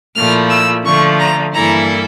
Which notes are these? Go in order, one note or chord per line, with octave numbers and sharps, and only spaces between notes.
A#2 F3 A3 E4 F6
E6
D3 F3 A3 C#6
A#5
G2 E3 A#3 E4 A4 A#5